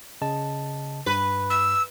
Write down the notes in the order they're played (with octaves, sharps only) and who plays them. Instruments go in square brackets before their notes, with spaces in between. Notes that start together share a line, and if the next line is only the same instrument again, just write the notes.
[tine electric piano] C#3 D#5 A5
[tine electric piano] G2 [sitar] B4
[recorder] E6